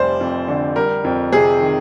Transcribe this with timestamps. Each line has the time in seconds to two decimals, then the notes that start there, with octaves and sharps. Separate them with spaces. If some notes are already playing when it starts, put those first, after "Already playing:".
Already playing: F1 G3 C5 D5
0.20 F2
0.48 D3
0.76 G3 A#4
1.04 F2
1.32 C3 G#4
1.61 D#3